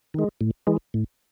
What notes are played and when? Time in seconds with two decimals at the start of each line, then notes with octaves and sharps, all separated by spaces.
0.14 D#3 G#3
0.41 A2
0.67 E3 G#3
0.94 A2